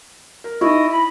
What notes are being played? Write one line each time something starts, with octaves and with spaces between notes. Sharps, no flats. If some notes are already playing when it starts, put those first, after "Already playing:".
A#4
D#4 E4 D#5 C#6
B5 A#6